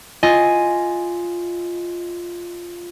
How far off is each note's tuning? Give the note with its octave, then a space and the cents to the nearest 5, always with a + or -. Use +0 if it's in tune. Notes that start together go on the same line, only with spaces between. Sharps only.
F4 -5 D#5 +0 G#5 +0